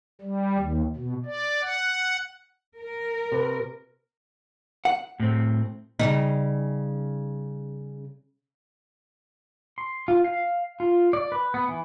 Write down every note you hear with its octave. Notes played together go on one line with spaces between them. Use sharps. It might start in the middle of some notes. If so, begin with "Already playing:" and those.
G3
D#2
B2
D5
F#5
A#4
C3 B4
F#5
A2 C4
C#3 G3 D#4
C6
F4
F5
F4
D5
B4
B3
E3